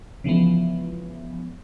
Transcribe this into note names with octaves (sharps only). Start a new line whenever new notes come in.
C#3 E3 F3 G#3 B3